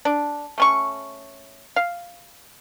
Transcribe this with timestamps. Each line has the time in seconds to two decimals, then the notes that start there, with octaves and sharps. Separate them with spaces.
0.05 D4
0.58 A3 C#4 C#6
1.76 F5